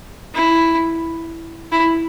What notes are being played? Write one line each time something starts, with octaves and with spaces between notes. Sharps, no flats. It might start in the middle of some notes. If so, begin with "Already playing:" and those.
E4
E4